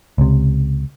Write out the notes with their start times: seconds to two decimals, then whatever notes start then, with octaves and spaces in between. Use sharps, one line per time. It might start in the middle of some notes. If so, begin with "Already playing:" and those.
0.18 C#2 C3